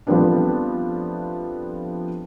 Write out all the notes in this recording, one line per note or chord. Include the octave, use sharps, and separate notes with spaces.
F3 G3 A3 B3 C4 D4